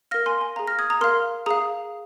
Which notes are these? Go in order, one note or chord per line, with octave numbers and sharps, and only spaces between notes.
A#4 F5 F6 A#6
G#5 C6
G#5
G#4 F5 A#5
F6 A#6
D#6 G#6
A#5 D#6
A#4 F5 C6 F6
G#4 F5 A#5 D#6